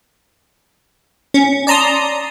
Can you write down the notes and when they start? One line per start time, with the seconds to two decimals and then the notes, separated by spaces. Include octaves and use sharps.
1.34 C#4
1.67 D5 A5 A#5 C6 D#6